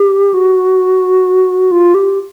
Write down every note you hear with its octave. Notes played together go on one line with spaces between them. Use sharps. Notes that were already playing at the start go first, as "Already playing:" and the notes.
Already playing: G4
F#4
F4
G4